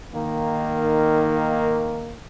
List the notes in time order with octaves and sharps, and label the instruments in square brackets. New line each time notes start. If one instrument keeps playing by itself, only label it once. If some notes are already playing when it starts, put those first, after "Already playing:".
[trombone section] D#3 A#3